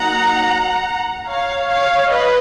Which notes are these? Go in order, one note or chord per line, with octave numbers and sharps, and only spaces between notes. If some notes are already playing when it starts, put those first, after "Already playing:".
Already playing: F#3 A#3 D#4 F#5 A#5
C#5 F5
C#5 F5
B4 D#5